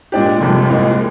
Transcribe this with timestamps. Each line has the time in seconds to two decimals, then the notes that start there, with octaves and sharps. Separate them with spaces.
0.12 A#2 G#3 D4 G4
0.40 F1 F2 C3 G3
0.70 C2 A#2 G#3 C4